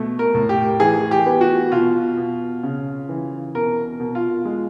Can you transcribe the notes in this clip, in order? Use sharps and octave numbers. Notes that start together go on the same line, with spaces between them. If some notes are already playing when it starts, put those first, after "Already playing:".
Already playing: B2 A3
A#4
A2
G4
E3 G#4
G4
B3
F#4
B2 F4
B2
C#3
E3
B2 A#4
B2
F4
G#3